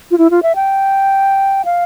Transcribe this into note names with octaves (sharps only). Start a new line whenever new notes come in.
F4
E4
F4
E5
G5
F5